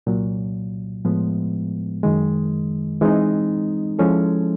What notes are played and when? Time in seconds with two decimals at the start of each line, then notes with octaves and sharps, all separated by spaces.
0.07 C2 A#2 F#3
1.05 A2 F3 G#3 B3
2.03 F#2 D#3 G#3
3.01 E3 G#3 C4 D#4
3.99 F3 G#3 C#4 E4 A4